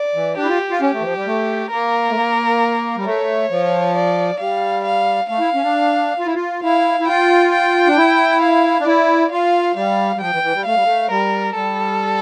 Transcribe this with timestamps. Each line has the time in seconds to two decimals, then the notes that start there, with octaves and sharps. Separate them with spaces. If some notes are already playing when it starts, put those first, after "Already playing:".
Already playing: D5
0.15 E3
0.37 D4 G4
0.44 E4
0.48 F4
0.71 F4
0.81 C#4 G4
0.93 A3
1.00 E3
1.04 F3
1.16 G3
1.26 A3
1.71 A#3 A#4
2.09 A3
2.15 A#3
2.97 G3
3.05 A3 C#5
3.50 F3
3.95 D5
4.40 G3 F5
4.84 F5
5.29 A3 F5
5.40 E4
5.55 C#4
5.63 D4
6.19 F4
6.26 E4
6.35 F4
6.63 E4 F5
7.00 E4
7.08 F4 G5
7.52 G5
7.87 D4
7.97 E4
8.42 F5
8.80 D4
8.86 E4 D5
9.31 F4 F5
9.76 G3 F5
10.16 G3
10.21 F3 G5
10.33 E3
10.43 E3
10.54 G3
10.65 A3 F5
10.75 G3
10.84 A3
11.10 G3 A#4
11.55 G3 A4